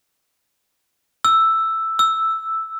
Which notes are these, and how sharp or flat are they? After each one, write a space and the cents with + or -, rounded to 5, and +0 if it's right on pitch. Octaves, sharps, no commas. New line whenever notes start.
E6 +5
E6 +0